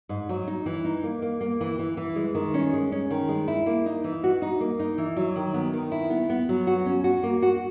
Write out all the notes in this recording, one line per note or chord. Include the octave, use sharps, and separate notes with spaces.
G#2
F#3
D#4
E3
D#4
A#3
A#3
A#3
E3
E3
E3
G#3
D#3
C#4
G#3
C#4
D#3
G#3
E4
A#3
D#4
E3
F#4
D#4
A#3
D#4
E3
F#3
D#3
B3
D#3
E4
B3
B3
F#3
F#4
C#4
F#4
A#3
F#4